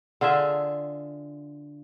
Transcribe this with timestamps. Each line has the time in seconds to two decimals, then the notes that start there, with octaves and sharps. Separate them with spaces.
0.21 D3 F4 G#4 E5